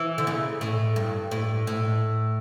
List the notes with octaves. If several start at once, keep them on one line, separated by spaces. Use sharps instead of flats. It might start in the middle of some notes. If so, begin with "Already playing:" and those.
Already playing: E3
D3
C#3
A2
G2
A2
A2